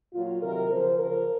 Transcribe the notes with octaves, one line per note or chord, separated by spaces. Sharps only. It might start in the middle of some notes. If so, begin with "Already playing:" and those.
A#2 F#3 F4
C3 D#3 F#3 A#4
C#3 F3 C5
C#3 F3 A#4